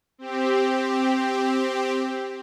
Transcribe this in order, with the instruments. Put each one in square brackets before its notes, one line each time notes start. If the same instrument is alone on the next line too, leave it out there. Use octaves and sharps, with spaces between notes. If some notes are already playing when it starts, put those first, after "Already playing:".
[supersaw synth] C4 G4